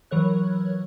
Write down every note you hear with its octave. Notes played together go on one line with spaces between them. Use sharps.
E3 F#3 A#4 C#5 F#6